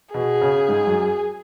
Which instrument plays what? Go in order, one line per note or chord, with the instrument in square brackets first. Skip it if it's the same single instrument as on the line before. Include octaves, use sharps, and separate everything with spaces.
[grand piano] B2 [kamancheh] G#4
[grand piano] C#3
G#2
F#2